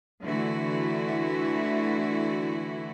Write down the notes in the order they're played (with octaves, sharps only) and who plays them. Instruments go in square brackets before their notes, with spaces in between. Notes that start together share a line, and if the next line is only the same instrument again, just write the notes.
[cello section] D3 E3 A3 E4 F#4